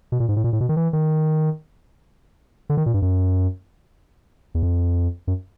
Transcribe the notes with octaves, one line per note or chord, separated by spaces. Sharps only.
B2
A#2
G#2
A2
A#2
A2
B2
D#3
E3
D#3
D3
D#3
A#2
G2
F#2
E2
F2
F#2